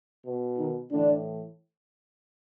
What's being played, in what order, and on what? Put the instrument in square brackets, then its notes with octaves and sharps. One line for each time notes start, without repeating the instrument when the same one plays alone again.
[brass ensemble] B2
D#3 D#4
A2 D3 E3 D4